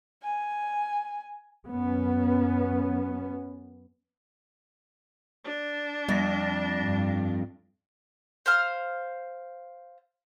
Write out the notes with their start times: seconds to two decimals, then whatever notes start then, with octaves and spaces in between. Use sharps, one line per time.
0.23 G#5
1.68 F#2 B3 C#4
5.44 D4
6.09 F2 G3 A6 A#6
6.80 G2
8.46 C5 F5 F6